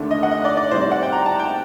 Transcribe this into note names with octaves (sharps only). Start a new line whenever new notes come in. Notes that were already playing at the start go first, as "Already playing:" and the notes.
Already playing: D#2 D3 A3 D4
D#5
F#5
D#5
D5
D5
A2 G3 C4 D#4 C5
D5
F#5
G5
A#5
A5
G5